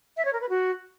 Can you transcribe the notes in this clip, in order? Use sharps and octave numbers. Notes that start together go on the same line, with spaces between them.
E5
C#5
A#4
B4
F#4